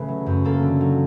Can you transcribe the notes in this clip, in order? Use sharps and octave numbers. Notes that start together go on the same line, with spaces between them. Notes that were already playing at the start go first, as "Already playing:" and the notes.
Already playing: C#3 A3 B4 E5
F#3
F#2
A#3 A4
D3
F#3